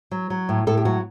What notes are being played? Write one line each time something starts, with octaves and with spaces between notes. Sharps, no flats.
F#3
F#3
A2
A2 A4
G4
F#3 F#4